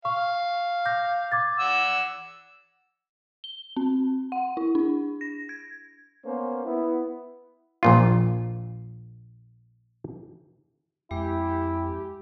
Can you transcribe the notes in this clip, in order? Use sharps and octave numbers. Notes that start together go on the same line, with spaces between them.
F5 C#6
D6 G6 A#6
D6 G#6 A6
F#5 E6
G7
C4
F#5
E4
D4
A#6
G#6
A#3 B3 C#4 C5
B3 E4
A#1 A#2 F4
F2 G#3 E4 G4